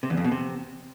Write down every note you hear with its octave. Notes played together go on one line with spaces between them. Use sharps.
C3
E2
F2
B2
C3